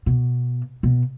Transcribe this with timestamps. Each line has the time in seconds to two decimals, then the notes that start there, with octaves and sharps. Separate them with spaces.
0.06 B2
0.83 B2